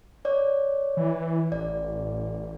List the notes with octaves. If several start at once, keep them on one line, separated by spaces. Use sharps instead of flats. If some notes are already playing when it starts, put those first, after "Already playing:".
C#5 D5
E3
A1 D5